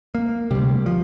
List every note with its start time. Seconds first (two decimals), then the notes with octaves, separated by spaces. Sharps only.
0.15 A#3
0.51 D2 C3 G3
0.86 F3